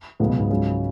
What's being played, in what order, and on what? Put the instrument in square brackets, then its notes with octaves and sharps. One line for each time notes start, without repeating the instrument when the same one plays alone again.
[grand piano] C#2 C#3 F#3 B3 [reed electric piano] A2
[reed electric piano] B2
G#2
[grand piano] C#2 C#3 F#3 C#4